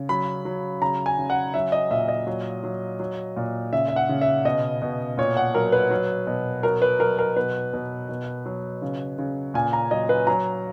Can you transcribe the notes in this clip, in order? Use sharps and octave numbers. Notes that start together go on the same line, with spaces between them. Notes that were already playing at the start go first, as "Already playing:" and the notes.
Already playing: C#3
F#3 B5
F#3
C#3 A#5
G#5
C#3
F#5
F#3 E5
D#5
A#2 E5
D#5
F#3
F#3
F#3
A#2
C#3 E5
E5
F#5
C#3
E5
B2 D#5
B2
A#2 C#5
F#5
F#3 A#4
B4
F#3
B2
F#3 A#4
B4
F#3 A#4
A#4
B2 B4
B2
B2
F#3
C#3
C#3
A#2 G#5
A#5
F#3 D#5
B4
F#3 A#5